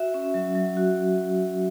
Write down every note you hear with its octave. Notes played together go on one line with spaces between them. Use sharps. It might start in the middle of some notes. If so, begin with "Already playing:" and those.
Already playing: F#4 E5
C#4
F#3
F#3
F#4